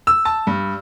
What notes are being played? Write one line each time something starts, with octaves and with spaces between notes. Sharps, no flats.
E6
A5
G2